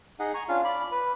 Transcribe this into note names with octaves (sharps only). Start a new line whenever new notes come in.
D#4 G#4 D#5 F#5
G#5 A#5 C#6
C#4 D4 F4 F5
D5 B5
B4 B5